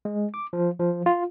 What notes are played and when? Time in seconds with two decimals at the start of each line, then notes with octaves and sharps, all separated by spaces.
0.05 G#3
0.34 D6
0.53 F3
0.79 F3
1.06 F4